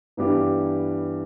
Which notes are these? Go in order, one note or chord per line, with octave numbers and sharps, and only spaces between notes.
G2 E3 B3 D4 G4